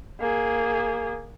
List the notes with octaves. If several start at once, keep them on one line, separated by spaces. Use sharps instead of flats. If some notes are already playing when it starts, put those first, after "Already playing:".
A#3 G#4